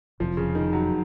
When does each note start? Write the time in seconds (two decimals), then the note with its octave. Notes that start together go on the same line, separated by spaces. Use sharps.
0.20 F1 F2 C3 F3
0.37 C#3
0.55 D#3
0.73 F#3